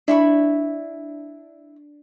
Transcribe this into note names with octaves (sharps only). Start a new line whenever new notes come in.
D4 E4 B5 C#6